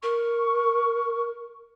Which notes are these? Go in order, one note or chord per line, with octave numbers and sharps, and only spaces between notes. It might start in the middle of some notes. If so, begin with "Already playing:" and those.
A#4 C#6